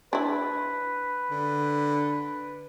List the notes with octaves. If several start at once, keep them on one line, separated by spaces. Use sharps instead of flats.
D4 E4 B4
D3